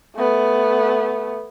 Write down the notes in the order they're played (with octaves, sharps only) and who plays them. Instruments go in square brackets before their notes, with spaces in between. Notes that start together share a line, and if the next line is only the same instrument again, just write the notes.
[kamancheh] A3 B3